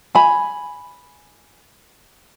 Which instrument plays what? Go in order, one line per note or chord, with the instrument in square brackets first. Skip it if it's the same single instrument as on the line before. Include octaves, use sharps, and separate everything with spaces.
[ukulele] G#5 B5